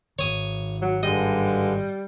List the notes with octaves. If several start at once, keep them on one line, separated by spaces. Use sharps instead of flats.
G#2 D#3 C#5 D#6
F#3
G2 D3 G3 G#3 D#5